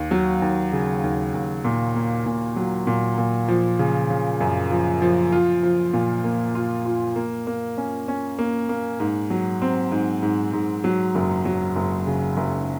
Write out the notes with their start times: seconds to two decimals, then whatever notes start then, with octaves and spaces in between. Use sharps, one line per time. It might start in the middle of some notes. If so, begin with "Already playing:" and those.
Already playing: D#2
0.11 F#3
0.42 D#2
0.73 C#3
1.04 D#2
1.34 D#2
1.65 A#2
1.95 A#3
2.26 A#2
2.56 F#3
2.87 A#2
3.18 A#2
3.48 F3
3.79 C#3
4.10 C#3
4.41 F#2
4.71 F3
5.02 F3
5.32 F4
5.63 F3
5.94 A#2
6.24 A#3
6.55 F4
6.86 F4
7.16 A#3
7.47 A#3
7.78 C#4
8.08 C#4
8.39 A#3
8.69 A#3
9.00 G#2
9.30 F#3
9.62 C4
9.92 G#2
10.23 G#2
10.53 G#2
10.84 F#3
11.15 F#1
11.45 F#3
11.76 F#1
12.07 C#3
12.37 F#1